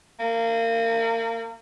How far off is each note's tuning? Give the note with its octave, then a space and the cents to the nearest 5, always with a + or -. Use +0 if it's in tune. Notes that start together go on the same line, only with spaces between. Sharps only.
A#3 -30